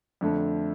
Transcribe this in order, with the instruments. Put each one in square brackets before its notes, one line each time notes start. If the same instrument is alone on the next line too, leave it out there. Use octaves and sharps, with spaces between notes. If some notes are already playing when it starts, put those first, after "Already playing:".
[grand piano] F2 D3 A3